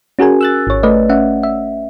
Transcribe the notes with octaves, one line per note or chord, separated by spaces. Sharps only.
C#4 F#4 G#4 A#4 G#5
E6 F#6 A6
G#1 C#5
A3 B4 D5 D#5
C#4 E5 F#5
E5